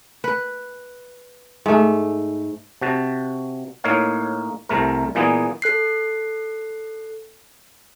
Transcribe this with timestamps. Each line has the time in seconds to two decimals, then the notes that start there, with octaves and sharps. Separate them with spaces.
0.24 B4
1.66 G#2 A3
2.81 C3 F#4 A5
3.84 A2 A#3 D#4 C#5 F5
4.69 C2 C3 A3 A#4
5.15 A#2 E3 G#3 A#3 B3 G#4
5.62 A4 F#6 C7